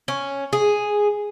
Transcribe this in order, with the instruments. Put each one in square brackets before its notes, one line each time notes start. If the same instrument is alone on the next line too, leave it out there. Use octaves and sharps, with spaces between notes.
[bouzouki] C#4
G#4